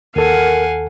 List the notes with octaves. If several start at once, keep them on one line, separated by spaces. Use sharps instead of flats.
D#2 A4 A#4 F5 F#5 G#5